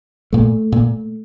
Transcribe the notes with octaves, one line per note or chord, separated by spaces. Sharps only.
A#2 A3
A#2